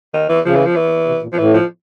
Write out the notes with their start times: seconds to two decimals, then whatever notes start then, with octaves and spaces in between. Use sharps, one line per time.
0.14 D#3
0.29 E3
0.45 C#3 F3
0.55 E3
0.66 F3
0.76 E3
1.07 C3
1.22 A#2
1.33 F3
1.38 A2 E3
1.54 F3